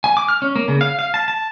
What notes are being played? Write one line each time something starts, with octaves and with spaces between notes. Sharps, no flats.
G#5
D6
F6
C#4
A#3
C#3
F5
F5
A5
A5